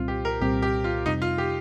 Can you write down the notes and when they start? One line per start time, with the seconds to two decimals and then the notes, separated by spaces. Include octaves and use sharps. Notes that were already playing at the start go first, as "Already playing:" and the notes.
Already playing: C2 A#2 G3 C4 F4
0.08 G4
0.25 A#4
0.40 C2 A#2 G3 C4 G4
0.62 G4
0.84 F4
1.06 F2 C3 G3 C4 D#4
1.22 F4
1.38 G4